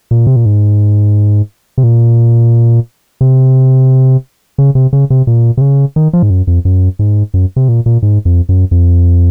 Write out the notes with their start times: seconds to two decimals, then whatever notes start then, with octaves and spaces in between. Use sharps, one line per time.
0.11 A#2
0.27 C3
0.36 A#2
0.46 G#2
1.78 C3
1.83 A#2
3.21 C3
4.58 C#3
4.75 C3
4.93 C#3
5.10 C3
5.27 A#2
5.57 C3
5.61 C#3
5.96 D#3
6.13 F3
6.23 G#2
6.30 F#2
6.47 F2
6.65 F#2
6.99 G#2
7.34 F#2
7.56 C3
7.68 A#2
7.86 A#2
8.02 G#2
8.25 F2
8.49 F#2
8.71 F2